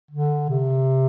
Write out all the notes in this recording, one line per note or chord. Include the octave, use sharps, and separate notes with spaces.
D3
C3